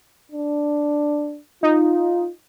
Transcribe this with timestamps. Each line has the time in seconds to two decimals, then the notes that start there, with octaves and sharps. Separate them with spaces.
0.32 D4
1.63 D#4 F4